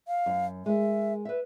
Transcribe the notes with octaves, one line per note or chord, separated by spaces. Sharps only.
F5
F#2
G#3 A#4 E5
B4 E5